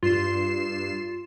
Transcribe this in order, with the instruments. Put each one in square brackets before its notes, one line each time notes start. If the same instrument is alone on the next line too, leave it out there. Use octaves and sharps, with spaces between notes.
[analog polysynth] G2 C7 E7 [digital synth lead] F4